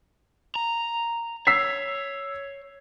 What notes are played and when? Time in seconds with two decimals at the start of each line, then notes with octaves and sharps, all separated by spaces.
0.56 A#5
1.47 C#5 E6 B6 C7